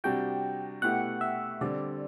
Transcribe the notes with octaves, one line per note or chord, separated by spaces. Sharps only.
C3 G3 D4 F#4 G5
B2 A3 E4 G4 F#5
E5
D3 G3 C4 D5